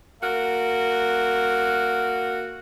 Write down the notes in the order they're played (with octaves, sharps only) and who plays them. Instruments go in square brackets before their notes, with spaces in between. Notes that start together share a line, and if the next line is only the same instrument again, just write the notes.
[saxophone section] A#3 F#4 A#4